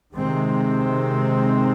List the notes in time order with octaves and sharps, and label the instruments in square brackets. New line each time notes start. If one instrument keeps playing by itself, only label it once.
[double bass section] C3 D#3 G#3 C4